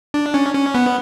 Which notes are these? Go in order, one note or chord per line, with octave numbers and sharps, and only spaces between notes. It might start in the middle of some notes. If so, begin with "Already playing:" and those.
D4
C#4
C#4
B3